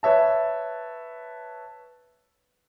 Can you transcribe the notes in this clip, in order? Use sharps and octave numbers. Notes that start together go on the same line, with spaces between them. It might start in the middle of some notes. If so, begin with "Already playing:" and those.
B4 C#5 E5 A5